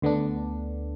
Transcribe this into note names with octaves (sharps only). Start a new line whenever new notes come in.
D2 D3 B3 D4